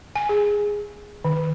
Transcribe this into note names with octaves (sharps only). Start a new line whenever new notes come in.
G#5
G#4
D#3